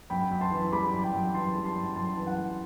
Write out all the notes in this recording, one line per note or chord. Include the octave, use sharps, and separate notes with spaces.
F#2 G5 B5
F#2
A5 C6
E3
G3 B5 D6
F#2
G5 B5
F#2
E3 A5 C6
G3
A5 C6
F#2
F#2 A5 C6
E3
F#5
G3